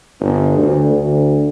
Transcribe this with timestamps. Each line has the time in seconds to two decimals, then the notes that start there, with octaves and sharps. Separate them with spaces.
0.20 G1
0.58 D2
0.89 D2